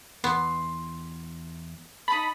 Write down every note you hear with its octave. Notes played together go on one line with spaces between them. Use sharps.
E2 B3 C6
D#4 A5 B5